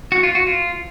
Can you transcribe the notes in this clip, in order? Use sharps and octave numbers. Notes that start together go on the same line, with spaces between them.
F#4
F4
F#4
F4